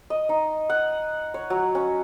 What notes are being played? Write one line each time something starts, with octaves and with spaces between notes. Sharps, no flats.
D#5
D#4
F#5
C#5
F#3
C#4